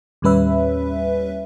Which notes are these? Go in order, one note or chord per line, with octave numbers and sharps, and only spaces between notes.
D#2 A2 G3 C#4 B4 E5